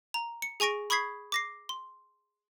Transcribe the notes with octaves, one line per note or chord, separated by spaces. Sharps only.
A#5
C#7
G#4 G#5 C#6 A#6 D7
B5 C#6 D#6 G#6 B6 C7
D6 A#6 C7
C6